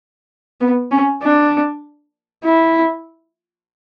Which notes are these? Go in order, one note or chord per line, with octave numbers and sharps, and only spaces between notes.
B3
C#4
D4
E4